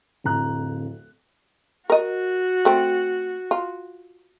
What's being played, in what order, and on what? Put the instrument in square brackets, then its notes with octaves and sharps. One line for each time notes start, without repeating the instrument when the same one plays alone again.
[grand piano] D1 F2 A#5 F#6
[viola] F#4 [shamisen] A#4 D#5
[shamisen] A3 C4
F4